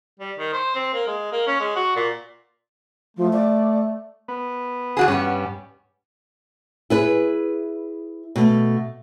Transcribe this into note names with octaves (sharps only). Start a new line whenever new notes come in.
G3
D#3
C5
C4
A#3
G#3
A#3
C#4
G#3
F#4
A#2
F3 A3
D5
B3
E2 F#4 G#4
G2 B3 C#4
E4 G#4 B4
B2 A3